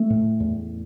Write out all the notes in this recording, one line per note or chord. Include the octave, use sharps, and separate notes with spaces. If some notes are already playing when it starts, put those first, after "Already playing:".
Already playing: A3
A2
E2